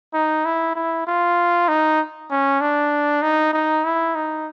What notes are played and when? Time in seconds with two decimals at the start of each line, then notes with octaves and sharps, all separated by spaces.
0.14 D#4
0.45 E4
0.75 E4
1.07 F4
1.68 D#4
2.30 C#4
2.61 D4
3.22 D#4
3.53 D#4
3.84 E4
4.15 D#4